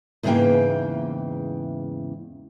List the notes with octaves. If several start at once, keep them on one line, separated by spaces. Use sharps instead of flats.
E2 G#2 C#3 E3 A#3 G5